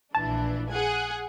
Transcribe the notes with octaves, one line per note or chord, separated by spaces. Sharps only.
A#1 E3 D4 A5
G#4 F#5 G#5